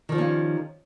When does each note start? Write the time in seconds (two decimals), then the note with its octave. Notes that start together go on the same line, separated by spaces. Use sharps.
0.09 D#3
0.12 F3
0.15 G3
0.18 C#4
0.21 F4